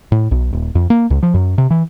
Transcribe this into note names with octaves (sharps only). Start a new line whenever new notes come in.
A2
B1
D#1
F2
A#3
C#2
F3
F#2
C3
E3